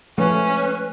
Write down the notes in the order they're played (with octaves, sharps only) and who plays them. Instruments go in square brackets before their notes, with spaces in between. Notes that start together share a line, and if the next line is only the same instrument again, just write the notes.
[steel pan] F3 G#3 A3 [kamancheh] C#4 [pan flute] B4